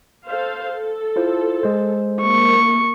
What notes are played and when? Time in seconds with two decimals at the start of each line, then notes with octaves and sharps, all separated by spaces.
0.26 A4 C5 F5
0.75 A4
1.16 E4 F4 C5
1.63 G#3 C5
2.21 A#3 C#6